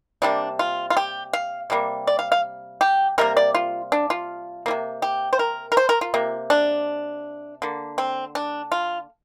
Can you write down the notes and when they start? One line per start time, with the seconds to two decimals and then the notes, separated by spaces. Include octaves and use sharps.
0.22 C3 G3 A#3 D4
0.59 F4
0.90 F4
0.97 G4
1.33 F5
1.70 C3 G3 A#3
2.07 D5
2.19 F5
2.32 F5
2.81 G4
3.18 C3 G3 A#3 A#4
3.37 D5
3.55 F4
3.92 D4
4.10 F4
4.66 F3 A#3
4.71 C3
5.02 G4
5.33 C5
5.39 A#4
5.72 A#4
5.77 C5
5.89 A#4
6.01 F4
6.14 C3 A#3
6.50 D4
7.62 D3 A#3
7.98 C4
8.35 D4
8.72 F4